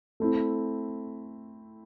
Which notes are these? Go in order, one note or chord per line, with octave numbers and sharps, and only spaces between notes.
A3 C4 E4